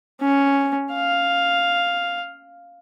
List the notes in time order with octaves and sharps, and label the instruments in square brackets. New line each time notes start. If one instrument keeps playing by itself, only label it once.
[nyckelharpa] C#4
F5